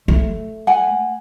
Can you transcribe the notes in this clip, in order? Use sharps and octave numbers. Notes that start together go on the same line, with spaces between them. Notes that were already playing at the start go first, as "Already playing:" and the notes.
A3
F#5 G#5